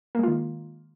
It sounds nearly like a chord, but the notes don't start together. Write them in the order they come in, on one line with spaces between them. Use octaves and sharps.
A#3 G#3 F4 D#3